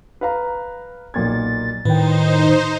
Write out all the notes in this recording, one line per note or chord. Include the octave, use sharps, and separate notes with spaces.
B4 F5 A#5
B1 A#2 G#6 A6
A2 D#3 D#4 B4 C5 G5